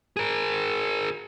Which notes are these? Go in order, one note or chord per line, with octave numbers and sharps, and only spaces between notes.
G#4 A#4